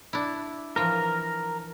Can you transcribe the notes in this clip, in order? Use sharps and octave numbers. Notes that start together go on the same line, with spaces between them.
D4 E4
E3 F3 A#4